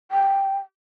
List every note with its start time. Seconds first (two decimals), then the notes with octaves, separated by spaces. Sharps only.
0.11 G5